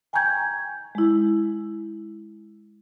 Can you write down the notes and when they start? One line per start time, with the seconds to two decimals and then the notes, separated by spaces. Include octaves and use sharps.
0.13 G5 G#5 A#5 C#6 G6 G#6
0.95 G#3 E4